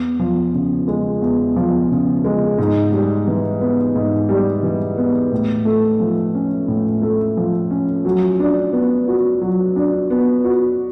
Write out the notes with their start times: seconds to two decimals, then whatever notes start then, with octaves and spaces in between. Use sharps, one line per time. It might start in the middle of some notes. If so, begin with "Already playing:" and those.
Already playing: E2
0.20 F3
0.54 C#3
0.88 G#3
1.22 E2
1.56 F3
1.91 C#3
2.24 G#3
2.58 G#2
2.92 G3
3.27 E3
3.61 B3
3.95 G#2
4.29 G3
4.63 E3
4.97 B3
5.32 A2
5.65 A3
6.00 F3
6.35 C#4
6.68 A2
7.02 A3
7.37 F3
7.71 C#4
8.05 F#3
8.40 D4
8.72 B3
9.08 F#4
9.41 F#3
9.76 D4
10.10 B3
10.44 F#4